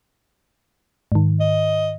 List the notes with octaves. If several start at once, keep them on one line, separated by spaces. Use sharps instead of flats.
G#2 D#3
D#5